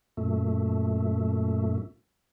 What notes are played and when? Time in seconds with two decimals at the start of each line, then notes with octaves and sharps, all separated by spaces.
0.17 F#2 A#2 A3